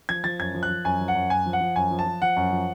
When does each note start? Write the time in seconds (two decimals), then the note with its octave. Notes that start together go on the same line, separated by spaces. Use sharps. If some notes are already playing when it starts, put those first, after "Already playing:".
0.09 F3 G#6
0.24 F3 A6
0.39 F#2 G#6
0.54 F3
0.63 F#6
0.70 F3
0.85 F#2 G#5
1.00 F3
1.08 F#5
1.15 F#2
1.30 F#2 G#5
1.46 F3
1.53 F#5
1.60 F3
1.76 F#2 G#5
1.91 F3
1.99 A5
2.06 F3
2.22 F3 F#5
2.36 F#2
2.52 F3